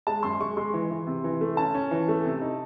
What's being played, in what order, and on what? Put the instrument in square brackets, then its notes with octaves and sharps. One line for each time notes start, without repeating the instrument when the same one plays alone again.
[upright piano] G#3 A5
F#2 C6
G#3 C#6
G#3 C6
E3
E3
C3
E3
A3
C#4 A5
C#4
E3
A3
C3
D#4